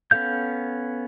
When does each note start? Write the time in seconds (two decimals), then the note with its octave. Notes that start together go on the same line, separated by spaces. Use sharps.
0.11 B3 C#4 A4 F5 G6